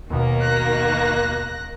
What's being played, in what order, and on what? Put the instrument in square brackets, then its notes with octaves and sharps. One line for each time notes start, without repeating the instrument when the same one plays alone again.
[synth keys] D#2 B2 [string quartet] D#3 A#3
[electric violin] F#6 A#6